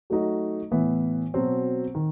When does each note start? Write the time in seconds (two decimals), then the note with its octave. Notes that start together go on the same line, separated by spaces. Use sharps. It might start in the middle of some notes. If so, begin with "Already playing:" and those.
0.10 F#3 A3 D#4 F#4
0.71 A2 E3 B3
1.34 B2 F#3 C4
1.95 D#3